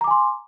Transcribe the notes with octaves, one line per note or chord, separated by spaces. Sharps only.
G#5 A#5 C6 D6